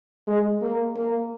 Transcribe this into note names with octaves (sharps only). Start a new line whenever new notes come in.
G#3
A#3
A#3